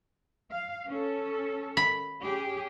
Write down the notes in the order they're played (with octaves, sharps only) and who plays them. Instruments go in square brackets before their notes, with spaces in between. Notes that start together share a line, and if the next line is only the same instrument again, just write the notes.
[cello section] F5
C#4 A4
[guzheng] B5
[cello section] C#4 G4 G#4